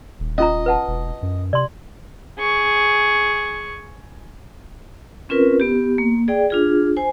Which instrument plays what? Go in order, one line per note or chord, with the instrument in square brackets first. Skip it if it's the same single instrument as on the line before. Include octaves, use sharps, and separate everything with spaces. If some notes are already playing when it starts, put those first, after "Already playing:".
[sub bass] D#1
[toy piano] C#4 F4 A#5 [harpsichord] D#5
[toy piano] B4 F#5 A5
[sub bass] E1
F#2
[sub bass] C3 [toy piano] D5 C6
[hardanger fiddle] G#4 C#6
[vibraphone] C4 C#4 F4 A#4 B4
B3 G4
A#3
G#4 D5 G5
D4 F4 G#4
C5 G#5